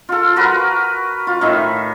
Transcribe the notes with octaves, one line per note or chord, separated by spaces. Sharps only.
F4 A4
F#4 A#4 B4 F#5
F4
A2 D#3 E5